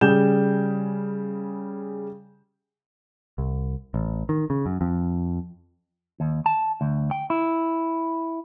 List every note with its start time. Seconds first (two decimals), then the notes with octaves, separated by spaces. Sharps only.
0.01 C#3 G3 G#4 G6 E7
3.38 C2
3.94 A1
4.29 D#3
4.50 C#3
4.66 F#2
4.81 F2
6.20 D#2
6.46 A5
6.81 D2
7.11 G5
7.30 E4